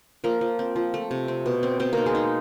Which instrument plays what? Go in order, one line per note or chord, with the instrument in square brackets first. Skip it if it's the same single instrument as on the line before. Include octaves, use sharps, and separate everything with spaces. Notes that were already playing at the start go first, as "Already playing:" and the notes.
[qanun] F3 A#3 A#4
F3
C4
F3
A3
C3
C4
B2
C4
B2 C4 C5
A#3 D#4 A#4
G#3 G#4
D#4